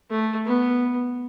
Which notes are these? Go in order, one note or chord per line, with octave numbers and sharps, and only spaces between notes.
A3
B3